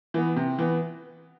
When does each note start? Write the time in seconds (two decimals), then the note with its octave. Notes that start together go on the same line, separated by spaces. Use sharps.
0.14 E3 B3
0.36 C3
0.58 E3 B3